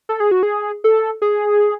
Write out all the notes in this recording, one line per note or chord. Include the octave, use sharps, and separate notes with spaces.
A4
G#4
F#4
G#4
A4
G#4